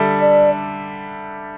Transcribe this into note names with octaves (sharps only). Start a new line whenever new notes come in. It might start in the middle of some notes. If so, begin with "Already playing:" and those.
Already playing: D3 G3 D4 A4 E5
D5